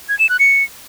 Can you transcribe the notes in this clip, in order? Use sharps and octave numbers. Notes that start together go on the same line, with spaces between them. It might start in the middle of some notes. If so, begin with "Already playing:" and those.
G#6
E7
F#6
C#7